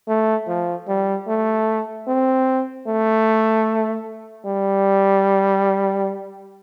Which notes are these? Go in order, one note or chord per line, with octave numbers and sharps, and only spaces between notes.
A3
F3
G3
A3
C4
A3
G3